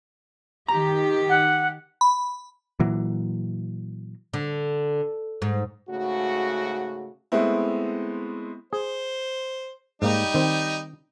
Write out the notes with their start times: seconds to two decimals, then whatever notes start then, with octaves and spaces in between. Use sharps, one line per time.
0.69 D#3 G4 A#5
1.29 F#5
2.01 B5
2.80 A#2 E3 F#3
4.34 D3
5.42 G#2
5.90 G#2 C#3 A3 F#4
7.32 G#3 A3 B3 C4 E4
8.73 G#4 C5
10.02 G#2 G3 A#3 D#4
10.34 D#3 C4